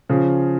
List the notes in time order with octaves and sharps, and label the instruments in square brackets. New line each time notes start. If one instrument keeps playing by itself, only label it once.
[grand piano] C#3 F3